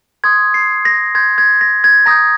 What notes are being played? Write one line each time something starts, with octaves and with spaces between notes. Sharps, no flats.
C6 D#6 G6 G#6
C7
A#6
C6 G6 G#6
G#6
A#6
G#6
A#5 D#6 G6 A#6